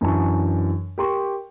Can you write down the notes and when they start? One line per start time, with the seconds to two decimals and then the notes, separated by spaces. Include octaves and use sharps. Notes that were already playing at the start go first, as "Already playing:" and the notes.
0.01 F#2 E3 D4 G#5 A5 C#6
0.98 G4 A#4 G5 C6 C#6